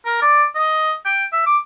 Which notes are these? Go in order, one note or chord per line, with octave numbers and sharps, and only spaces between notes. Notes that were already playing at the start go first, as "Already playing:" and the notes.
A#4
D5
D#5
G5
E5
D6